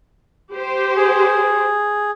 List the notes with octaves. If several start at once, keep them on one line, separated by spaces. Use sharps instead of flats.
G4 C5
G#4